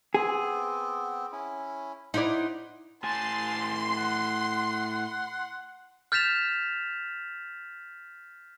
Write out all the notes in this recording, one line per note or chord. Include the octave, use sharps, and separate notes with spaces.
B3 C4 G#4
C#4 E4
D#4 E4 D5 F#5 C6
A2 G#5 A5 C6
F#5
F6 G6 A6 B6 E7 F7